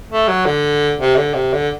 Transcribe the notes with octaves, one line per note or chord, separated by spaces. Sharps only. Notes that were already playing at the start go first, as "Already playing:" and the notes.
A3
F#3
D3
C3
D3
C3
D3